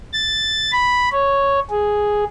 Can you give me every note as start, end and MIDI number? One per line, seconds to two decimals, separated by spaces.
0.13 0.71 93
0.73 1.09 83
1.12 1.59 73
1.70 2.24 68